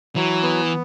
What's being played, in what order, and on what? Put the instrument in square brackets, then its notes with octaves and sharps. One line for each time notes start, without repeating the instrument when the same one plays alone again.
[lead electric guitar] E3 [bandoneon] F#3
[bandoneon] B3